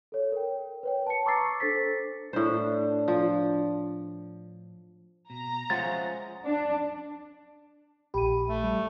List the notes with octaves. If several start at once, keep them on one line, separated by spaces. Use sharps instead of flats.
A4 C#5
A#4 G5
B4 C#5 G5
A5 C#7
A#5 C#6 D6 E6 A6 C7
D4 A4 C5 A6 B6
A2 D4 C5
F3
B2 A#5
F3 G#3 C#4 C5 E5 F#5 A6
D4
A#1 G4 B5 D#7
A3
G3